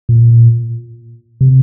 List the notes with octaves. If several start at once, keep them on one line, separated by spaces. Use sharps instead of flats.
A#2
C3